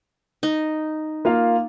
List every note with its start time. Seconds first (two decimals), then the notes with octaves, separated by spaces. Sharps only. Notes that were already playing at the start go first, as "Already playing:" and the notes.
0.43 D#4
1.25 A#3 F4 F5